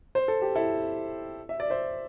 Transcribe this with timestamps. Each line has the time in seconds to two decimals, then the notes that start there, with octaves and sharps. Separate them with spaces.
0.15 C5
0.28 A4
0.42 G4
0.55 E4 A4
1.49 E5
1.60 D5
1.70 C5 E5